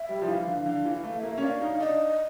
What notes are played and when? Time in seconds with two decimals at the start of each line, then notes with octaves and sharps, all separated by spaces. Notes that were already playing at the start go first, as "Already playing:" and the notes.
Already playing: E5
0.09 G3
0.22 F3
0.28 E3 F5
0.47 D3
0.66 D3 F5
0.85 E3
0.91 F5
1.04 A3
1.17 E5
1.23 A#3
1.38 C#4
1.42 D4 F5
1.62 D#4
1.79 D4 D#5